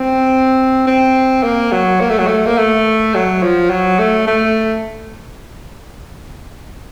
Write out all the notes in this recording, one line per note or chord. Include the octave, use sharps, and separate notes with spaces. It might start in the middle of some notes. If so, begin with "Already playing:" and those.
Already playing: C4
C4
A#3
F#3
A#3
A3
F#3
A3
A#3
A3
F#3
F3
F#3
A3
A3